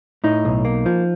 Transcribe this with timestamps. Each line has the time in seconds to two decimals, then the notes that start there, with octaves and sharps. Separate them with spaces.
0.24 A2 D#4
0.45 B1
0.65 A#3
0.86 F3